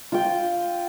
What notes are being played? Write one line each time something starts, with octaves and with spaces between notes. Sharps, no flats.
F4 G5